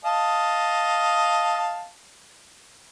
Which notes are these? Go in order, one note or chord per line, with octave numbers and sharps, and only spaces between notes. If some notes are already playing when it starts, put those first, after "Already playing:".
D#5 F5 A5